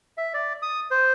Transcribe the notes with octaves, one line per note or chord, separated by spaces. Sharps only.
E5
D5
D#6
C5